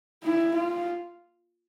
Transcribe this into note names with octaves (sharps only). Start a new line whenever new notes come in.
E4
F4